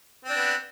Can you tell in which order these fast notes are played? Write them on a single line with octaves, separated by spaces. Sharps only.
C4 D4 B3